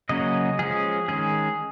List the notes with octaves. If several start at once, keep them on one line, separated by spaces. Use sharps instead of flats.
C#3 F#3 A#3 C#4 D#5
F3 G#3 C#4 G#4
D#3 G#3 C#4 G#4